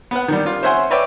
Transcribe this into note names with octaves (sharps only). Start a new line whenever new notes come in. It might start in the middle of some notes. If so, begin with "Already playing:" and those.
B3 B4 F#5
D#3 G3
D4 F4
C5 C#5 E5 F#5 G#5 C6
B4 C#5 D5 E5 G5